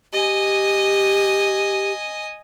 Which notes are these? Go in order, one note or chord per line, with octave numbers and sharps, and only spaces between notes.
G4 D#5 G#5